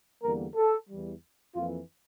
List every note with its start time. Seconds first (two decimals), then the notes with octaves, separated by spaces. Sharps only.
0.22 E2 D3 G3 A#3 A#4
0.56 A4
0.89 E2 E3 G3
1.55 F2 E3 A#3 F4